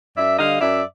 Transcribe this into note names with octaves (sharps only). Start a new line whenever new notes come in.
F#2 D5 E5
D3 G3 D#5 F5
F#2 D5 E5